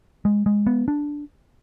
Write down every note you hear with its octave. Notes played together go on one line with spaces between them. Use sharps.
G#3
G#3
B3
D4